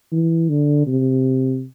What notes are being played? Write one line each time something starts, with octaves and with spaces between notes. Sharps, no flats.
E3
D3
C3